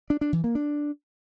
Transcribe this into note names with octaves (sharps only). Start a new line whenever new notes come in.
D4
D4
E3
A#3
D4